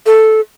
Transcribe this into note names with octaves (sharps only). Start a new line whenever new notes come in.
A4